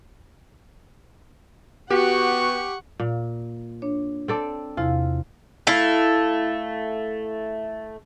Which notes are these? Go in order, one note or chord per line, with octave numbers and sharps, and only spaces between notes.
B3 F#4 G4 F#5 C#6
A#2
D4 C#5
C4 A4 D5
E2 C3 E4 F4
A3 E4 F5